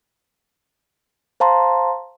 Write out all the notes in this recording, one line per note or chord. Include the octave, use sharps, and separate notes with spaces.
C5 F5 A5 A#5 C6